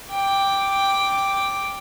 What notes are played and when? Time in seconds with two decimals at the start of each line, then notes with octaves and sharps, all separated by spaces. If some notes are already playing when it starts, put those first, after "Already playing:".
0.11 G5 D6